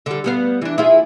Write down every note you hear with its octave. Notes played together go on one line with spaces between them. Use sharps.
D3 G3
G3 B3 F5
E3 D4
E4 F4 G#4